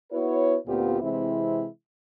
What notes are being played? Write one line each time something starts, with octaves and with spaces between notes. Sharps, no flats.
B3 E4 F#4 B4 C#5
D2 A#2 B3 C4 F4 G4
C3 E3 G#3 C4 E4